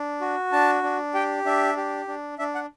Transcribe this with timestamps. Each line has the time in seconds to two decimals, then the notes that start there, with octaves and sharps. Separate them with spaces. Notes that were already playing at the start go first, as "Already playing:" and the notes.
Already playing: D4
0.21 F#4
0.52 D4 A5
0.83 D4
1.14 G4 G5
1.45 D4 E5
1.77 G4
2.08 D4
2.39 D4 E5
2.55 F#5